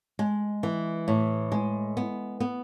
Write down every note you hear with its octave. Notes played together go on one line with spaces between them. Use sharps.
G#3
E3
A2
G#3
B3
B3